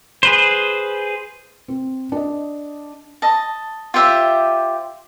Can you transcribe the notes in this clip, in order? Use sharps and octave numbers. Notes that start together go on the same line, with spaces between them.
G#4 B4 C5
C4
D4 D#5
D#5 A5
F4 G4 C5 E5